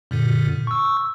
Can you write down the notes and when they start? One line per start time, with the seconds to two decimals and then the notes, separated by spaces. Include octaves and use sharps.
0.11 F#2 A#2 D3
0.67 C#6 E6